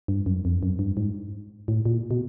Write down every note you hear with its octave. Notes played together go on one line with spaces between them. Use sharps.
G2
F#2
F2
F#2
G2
G#2
A2
A#2
B2